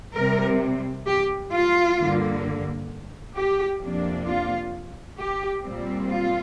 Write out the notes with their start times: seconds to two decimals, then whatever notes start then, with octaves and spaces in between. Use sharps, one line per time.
0.16 C3 G3 C4 A#4
1.07 G4
1.53 F4
1.99 G2 D3 A#3
3.36 G4
3.81 F2 C3 A#3 D4
4.28 F4
5.19 G4
5.65 A#2 G3 C4
6.11 F4